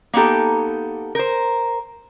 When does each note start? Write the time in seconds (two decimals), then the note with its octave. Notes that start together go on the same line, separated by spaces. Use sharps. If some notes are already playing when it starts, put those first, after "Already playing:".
0.13 A#3 B3 D#4 G4 A4
1.15 A#4 C5